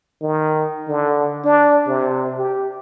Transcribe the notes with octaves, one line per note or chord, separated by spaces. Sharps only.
D#3
D3
D4
C3
G4